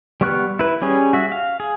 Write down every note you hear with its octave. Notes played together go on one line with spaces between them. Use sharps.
G3 B3 C#6 F6 F#6
E4 B4
G3 C#4 G#4 C#5
F#4 E5
F5
G#4